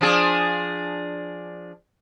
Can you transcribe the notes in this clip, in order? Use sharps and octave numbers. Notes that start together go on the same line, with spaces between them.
F3 D4 G#4